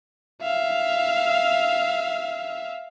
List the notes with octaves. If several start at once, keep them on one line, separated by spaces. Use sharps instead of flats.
E5 F5